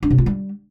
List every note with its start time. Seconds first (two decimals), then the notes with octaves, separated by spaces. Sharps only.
0.03 D4
0.10 C3
0.18 F4
0.26 G3